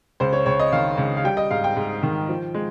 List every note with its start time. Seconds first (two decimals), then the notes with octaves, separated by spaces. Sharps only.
0.20 C#2 C5
0.33 C#5
0.46 C#2 C#5
0.60 D#5
0.72 D#3 F5
0.98 C#2
1.17 F5
1.24 G3 G5
1.37 D#5
1.51 G#2 F5
1.64 G5
1.76 G#2
2.03 D#3
2.29 F3
2.54 G#3